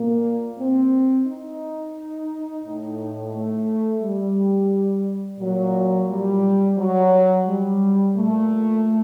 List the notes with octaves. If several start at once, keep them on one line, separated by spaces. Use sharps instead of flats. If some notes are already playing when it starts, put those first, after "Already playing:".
Already playing: A#2 A#3
C4
D#4
A2
A3
G3
A#2 F#3
G3
F#3
G3
A#2 A3